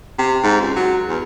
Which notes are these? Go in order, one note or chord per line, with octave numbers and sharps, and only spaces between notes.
C3
G#2
C#2
F#3
E2